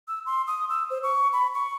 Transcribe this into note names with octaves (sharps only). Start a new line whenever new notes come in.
E6
C6
D#6
E6
C5
C#6
B5
C#6